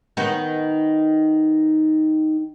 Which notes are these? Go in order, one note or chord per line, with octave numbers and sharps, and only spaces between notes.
D#3 B3 D#4